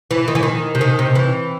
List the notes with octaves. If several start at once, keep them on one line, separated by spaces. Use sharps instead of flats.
E3
D#3
E3
D#3
C3
D#3
C3
E3